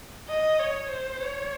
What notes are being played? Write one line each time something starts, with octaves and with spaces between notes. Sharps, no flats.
D#5
C#5
C5
C#5